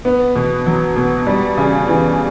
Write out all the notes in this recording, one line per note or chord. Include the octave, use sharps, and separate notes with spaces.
B3
B2
F#3
B2
G3
C#3
E3